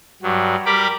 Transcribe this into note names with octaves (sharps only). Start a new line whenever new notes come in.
G2 F#3
G3 G4 A#4 B5 D6